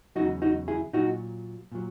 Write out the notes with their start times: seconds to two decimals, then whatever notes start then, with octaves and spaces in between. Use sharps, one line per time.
0.16 E2 C#3 F#3 D#4 F#4
0.42 D#4 F#4
0.68 E4 G#4
0.93 A#2 F#3 D#4 F#4
1.72 A#2 F#3